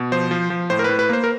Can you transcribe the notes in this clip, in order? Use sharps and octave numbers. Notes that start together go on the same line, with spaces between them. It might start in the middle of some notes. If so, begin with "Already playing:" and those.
Already playing: B2
F3 C5
F3
F3
A2 C5
A#4
A2 B4
B4
A#3 C5
A#4